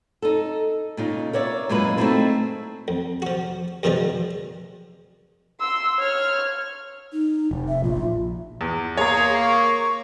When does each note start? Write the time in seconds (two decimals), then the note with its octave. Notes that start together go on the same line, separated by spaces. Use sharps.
0.22 D#4 A4
0.97 A#2 C#3 D#4
1.33 A#4 C#5 D5 E5
1.69 F#2 A#2 G#3 A#3 E4 B4
1.97 A3 C4 C#4 D#4 E4 G#4
2.88 F2
3.22 F3 F#4
3.83 F#2 B2 D#3 F3 G3 G#3
5.60 C6 E6
6.00 C#5 F6
7.13 D#4
7.51 F1
7.68 E5
7.84 A#1 F4
8.61 E2
8.97 A#3 G#4 C#5 A#5 C6
9.39 C#6